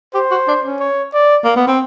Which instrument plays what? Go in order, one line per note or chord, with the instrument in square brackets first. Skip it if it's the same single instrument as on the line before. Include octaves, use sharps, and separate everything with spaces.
[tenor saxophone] G4 [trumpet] C5
[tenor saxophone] F#4
D4
C#4
[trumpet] C#5
D5
[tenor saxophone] A#3
B3
C4